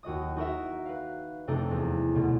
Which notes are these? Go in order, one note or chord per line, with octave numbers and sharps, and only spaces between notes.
D#2 F#4 D#5 D#6
D#4 F#4 A#4 E5
B4 F5
F2 C3 A3 D4 D#4
E2
D2 B2